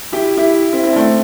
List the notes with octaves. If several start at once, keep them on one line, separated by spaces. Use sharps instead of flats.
E4 G4
E4 G4
C4 E4
C4 E4
D4
A3 C4